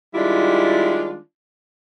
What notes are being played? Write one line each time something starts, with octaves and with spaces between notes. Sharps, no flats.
D#3 G3 G#3 D4 E4 F4